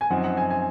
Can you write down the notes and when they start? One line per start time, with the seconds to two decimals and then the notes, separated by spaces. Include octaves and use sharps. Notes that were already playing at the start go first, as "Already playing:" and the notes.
0.01 G#5
0.10 F#2 F3 C4 D#4 F#5
0.24 F#5
0.37 G#5
0.50 G#5